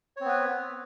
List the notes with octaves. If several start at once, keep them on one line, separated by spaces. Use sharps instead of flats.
B3 C4 B4 C#5